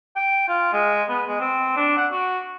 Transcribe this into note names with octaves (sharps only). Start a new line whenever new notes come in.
G5
F4
G#3
B3
G#3
C4
D4
F#5
F#4